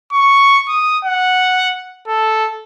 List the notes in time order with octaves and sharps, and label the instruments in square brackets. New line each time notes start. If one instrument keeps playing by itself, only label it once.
[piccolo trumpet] C#6
D#6
F#5
A4